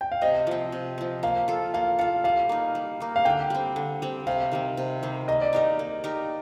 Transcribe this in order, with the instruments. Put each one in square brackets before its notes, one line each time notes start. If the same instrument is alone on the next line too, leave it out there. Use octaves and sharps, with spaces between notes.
[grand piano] G5
F5
[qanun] C3 [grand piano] D#5
[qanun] F3 C4
C3
F3 C4
[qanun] A#3 [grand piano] F5
[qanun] F4 A4
[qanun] A#3 [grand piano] F5
[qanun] F4 A4 [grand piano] F5
[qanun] G3 [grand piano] F5
[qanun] A#3 D#4
G3
A#3 D#4
[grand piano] F5
[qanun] D3 [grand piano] G5
[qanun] G3 C4
D3
G3 C4
[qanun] C3 [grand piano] F5
[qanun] D#3 G3 C4
C3
D#3 G3 C4
[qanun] A#3 [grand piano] D#5
[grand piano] D5
[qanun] D#4 G4 A#4 [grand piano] D#5
[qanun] A#3
D#4 G4 A#4